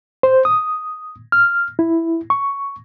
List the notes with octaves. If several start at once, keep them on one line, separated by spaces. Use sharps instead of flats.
C5
D#6
F6
E4
C#6